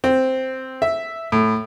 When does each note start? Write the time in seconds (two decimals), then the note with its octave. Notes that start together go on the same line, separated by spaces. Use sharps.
0.04 C4
0.82 E5
1.32 A2